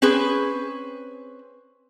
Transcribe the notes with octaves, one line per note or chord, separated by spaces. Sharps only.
C4 C#4 G#4 B4